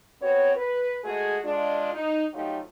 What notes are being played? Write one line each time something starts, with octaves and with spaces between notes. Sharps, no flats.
B3 C4 F#4 C#5
B4
G#3 A3 F#4 G#4
G#3 D4 F4
D#4
F3 F#3 A3 D#4 F4 G4